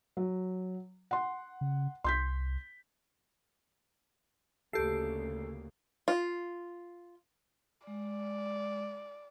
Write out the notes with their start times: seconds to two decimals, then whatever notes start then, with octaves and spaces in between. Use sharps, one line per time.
0.17 F#3
1.11 F#5 C6
1.61 C#3
2.04 C2 C6 G6 B6
4.73 D2 C#3 A#3 G4 A4 C7
6.08 F4
7.87 G#3 D5